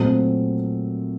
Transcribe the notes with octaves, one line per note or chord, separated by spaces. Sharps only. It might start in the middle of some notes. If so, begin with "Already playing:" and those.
Already playing: A#2 F#3 A3 C4